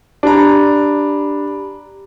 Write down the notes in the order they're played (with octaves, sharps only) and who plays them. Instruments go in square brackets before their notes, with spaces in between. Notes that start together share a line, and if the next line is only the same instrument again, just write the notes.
[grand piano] D4 A#5 [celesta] G4 B5